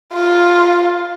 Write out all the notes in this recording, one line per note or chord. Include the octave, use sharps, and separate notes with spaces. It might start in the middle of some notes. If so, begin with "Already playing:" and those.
F4